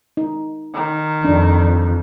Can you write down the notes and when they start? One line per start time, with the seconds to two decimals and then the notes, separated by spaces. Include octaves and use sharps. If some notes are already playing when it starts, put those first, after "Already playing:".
0.17 D#4
0.74 D#3
1.25 F2 D4